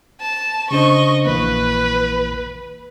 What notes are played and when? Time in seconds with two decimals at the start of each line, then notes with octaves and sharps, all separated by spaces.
0.21 A5
0.71 C#3 D4 C5 D#5 C#6
1.26 A#1 E3 A#3 B4